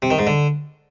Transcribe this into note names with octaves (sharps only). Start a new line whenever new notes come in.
C3
D#3
G#2
D3